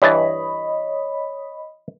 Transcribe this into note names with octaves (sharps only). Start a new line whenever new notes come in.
G2 E3 C#5 D#5 A5 B5